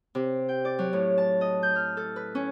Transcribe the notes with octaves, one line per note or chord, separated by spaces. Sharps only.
C3
G5
D5
F#3
A2
A5
D#5
G6
F6
A4
B4
C#4